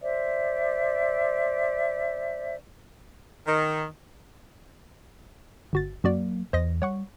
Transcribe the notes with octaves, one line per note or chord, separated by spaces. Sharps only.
C5 D5 E5
D#3
G1 F#4 A6
F#2 F#3 A#3 F#4 D5
E2 C5 D#5 A#6
G3 C#5 F#5 C#6